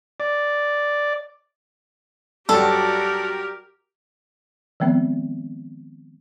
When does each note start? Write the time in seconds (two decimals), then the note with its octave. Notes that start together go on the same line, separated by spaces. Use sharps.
0.20 D5
2.49 G2 F#3 F#4 G4 A4 A#4 D5
4.80 D#3 F3 G#3 B3 C4